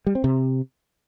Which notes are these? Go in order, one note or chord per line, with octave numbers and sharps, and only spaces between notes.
G3
C4
C3